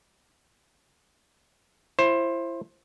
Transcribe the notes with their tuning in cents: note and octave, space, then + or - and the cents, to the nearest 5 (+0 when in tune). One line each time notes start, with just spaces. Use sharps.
E4 +30 C5 +20